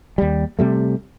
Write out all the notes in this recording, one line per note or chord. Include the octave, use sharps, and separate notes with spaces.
D#2 G3
C3 G3 A3